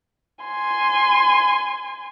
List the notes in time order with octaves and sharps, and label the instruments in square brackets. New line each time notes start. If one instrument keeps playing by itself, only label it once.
[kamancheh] G#5 C6